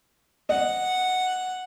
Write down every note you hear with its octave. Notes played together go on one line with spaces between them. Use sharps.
D#5 F#5